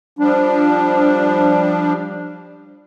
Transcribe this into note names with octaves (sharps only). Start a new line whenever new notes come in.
F3 G3 D4